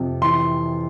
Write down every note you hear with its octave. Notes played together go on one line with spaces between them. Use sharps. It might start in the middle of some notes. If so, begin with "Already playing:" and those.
Already playing: F2 C3
E3 C6